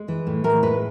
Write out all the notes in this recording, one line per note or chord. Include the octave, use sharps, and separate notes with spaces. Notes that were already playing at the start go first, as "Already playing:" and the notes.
Already playing: G#3
E3
A2
A2 A#4
G#3 B4